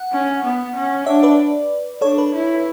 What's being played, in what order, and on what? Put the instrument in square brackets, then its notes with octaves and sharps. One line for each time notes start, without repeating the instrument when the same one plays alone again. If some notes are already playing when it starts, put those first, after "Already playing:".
Already playing: [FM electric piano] F#5
[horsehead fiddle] C#4
B3
C#4
[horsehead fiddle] D4 [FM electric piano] C#5 E5
[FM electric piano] B4 D5
[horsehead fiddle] D4 [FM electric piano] A4 C#5
[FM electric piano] B4
[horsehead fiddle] E4